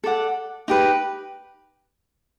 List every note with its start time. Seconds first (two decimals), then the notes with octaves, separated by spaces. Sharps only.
0.04 A4 D5 F#5
0.68 D#4 G4 B4